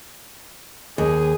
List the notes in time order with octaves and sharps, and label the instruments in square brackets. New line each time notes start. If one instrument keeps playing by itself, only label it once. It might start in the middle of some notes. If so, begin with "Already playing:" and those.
[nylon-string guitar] D#2 [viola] G#4